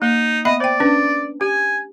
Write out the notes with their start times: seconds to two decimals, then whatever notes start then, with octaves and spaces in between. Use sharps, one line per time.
0.02 A#3 D#4
0.45 B3 D#5 E5 B5
0.60 C5 D5 G5
0.80 C#4 D4 B4
1.41 G4 G#5